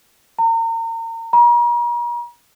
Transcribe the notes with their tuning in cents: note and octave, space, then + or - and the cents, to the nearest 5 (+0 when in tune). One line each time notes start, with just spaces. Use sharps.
A#5 -35
A#5 +40